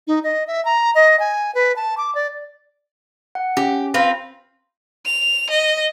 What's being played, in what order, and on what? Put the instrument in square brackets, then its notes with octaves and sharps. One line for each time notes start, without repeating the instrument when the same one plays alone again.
[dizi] D#4
D#5
E5
A#5
D#5
G#5
B4
A5
D6
D5
[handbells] F#5
[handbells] C#4 [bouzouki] G4
[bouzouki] C4 F4 B4 [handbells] A#6
[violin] F7
D#5